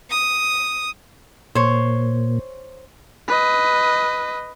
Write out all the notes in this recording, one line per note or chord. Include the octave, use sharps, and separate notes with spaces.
D#6
A#2 C5 C#5
B4 D#5